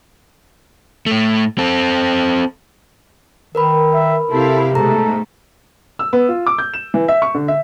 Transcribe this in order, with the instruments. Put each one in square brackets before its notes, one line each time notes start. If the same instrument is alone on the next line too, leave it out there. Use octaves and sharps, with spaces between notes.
[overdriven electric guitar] A2 A3
C4 A4
[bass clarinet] D#3 [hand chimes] A#4 B4 B5
[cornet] E5
[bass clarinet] C3 [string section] C4 E4 F5 [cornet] A4
[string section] G#2 B2 A3 [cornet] A4 [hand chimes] A#5
[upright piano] E6
B3
F4
D6
G6
E7
E3
E5
C#6
D3
E5